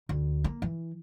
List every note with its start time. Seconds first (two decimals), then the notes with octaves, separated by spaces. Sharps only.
0.09 D2
0.44 A#3
0.62 E3